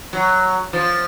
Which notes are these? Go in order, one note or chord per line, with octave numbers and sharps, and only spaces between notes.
F#3
F3